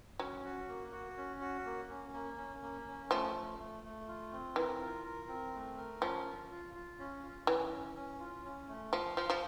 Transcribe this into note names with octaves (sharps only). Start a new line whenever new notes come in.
F#3 C#4
F#4
A#3
F#4
C#4
F#4
A#3
C#4
A#3
C#4
A#3
C#4
F3 A3
A3
A3
A3
F4
C4
E3 A#4
F4
A#4
C4
A3
A#4
F3 C#4
F4
F4
F4
C#4
F4
E3 C#4
C#4
C#4
F4
C#4
A3
F3 F5
F3 C5
F3